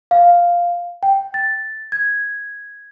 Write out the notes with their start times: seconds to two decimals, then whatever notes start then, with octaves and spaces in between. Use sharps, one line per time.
0.11 F5
1.03 G5
1.34 A6
1.92 G#6